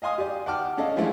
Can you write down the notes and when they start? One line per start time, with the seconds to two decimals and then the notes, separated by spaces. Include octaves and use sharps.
0.02 D#5 F5 G#5 C6 D#6
0.18 G4 D5
0.46 F#5 G5 A5 D6 F6
0.77 C#4 D4 A4 D#5 F5
0.96 E3 F3 G#3 A3 E4